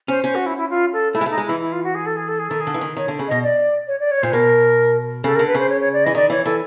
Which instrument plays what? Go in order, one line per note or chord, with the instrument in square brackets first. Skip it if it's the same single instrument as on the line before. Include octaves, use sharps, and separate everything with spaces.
[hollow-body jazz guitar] C#4 [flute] C5
[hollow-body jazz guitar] C#4 [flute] C5
[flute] F#4
E4
E4
F4
A4
[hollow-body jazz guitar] A3 [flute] E4
[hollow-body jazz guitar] G#3
[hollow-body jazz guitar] A3 [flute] D#4
[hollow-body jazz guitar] G#3
[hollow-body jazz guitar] E3 [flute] E4
[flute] E4
F4
F#4
G#4
A4
G#4
A4
G#4
[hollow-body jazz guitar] D#3 [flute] A4
[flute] G#4
[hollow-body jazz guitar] D3
E3
D#3
[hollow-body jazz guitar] D#3 [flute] C#5
[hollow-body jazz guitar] D3
C#3
[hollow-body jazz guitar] B2 [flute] D#5
[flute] D5
C#5
D5
C#5
[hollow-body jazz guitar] A#2 [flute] C5
[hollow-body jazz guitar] B2 [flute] A#4
[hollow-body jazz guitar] C#3 [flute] A4
[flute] A#4
[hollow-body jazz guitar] D3
[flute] B4
[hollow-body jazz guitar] C#3 [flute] C5
[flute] C#5
C#5
D5
[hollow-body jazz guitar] E3 [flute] D#5
[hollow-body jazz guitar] D#3 [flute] D5
[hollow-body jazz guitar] E3 [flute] C#5
[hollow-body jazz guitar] E3 [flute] A4